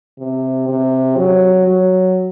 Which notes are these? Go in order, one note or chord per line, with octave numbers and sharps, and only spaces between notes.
C3
C3
F#3
F#3